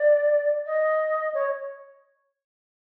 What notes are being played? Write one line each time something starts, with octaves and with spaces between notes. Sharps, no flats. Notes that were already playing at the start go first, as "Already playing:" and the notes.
Already playing: D5
D#5
C#5